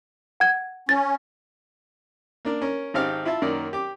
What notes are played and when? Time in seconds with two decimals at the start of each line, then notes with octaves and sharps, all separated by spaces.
0.40 F#5 G#6
0.89 C#4 A6
2.45 A#3 D4 A#4
2.62 C#4 A#4
2.94 G#1 C4 D#4 G4 F5 F6
3.25 E4 F4 E5 A5
3.42 F#2 D#3 A#3 A#4 D5
3.73 G4 D6